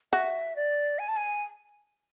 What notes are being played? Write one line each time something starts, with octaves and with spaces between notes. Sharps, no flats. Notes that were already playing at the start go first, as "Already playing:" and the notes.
F#4 E5
D5
G#5
A5
G#5